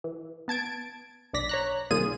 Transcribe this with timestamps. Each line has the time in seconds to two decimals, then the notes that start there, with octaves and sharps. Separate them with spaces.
0.04 E3
0.48 B3 A5 G#6 D7
1.33 B1 D4 D5 A#6 B6
1.49 C#5 A#5 F#6
1.90 C2 A#2 D#3 F4 G#4 D#7